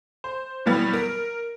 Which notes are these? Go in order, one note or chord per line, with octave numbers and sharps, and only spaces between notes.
C5
B2 E3 F#3 G3 B3
A#4